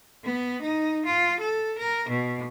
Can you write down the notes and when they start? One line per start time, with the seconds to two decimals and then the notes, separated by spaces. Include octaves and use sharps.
0.24 B3
0.61 D#4
1.05 F4
1.40 A4
1.78 A#4
2.09 B2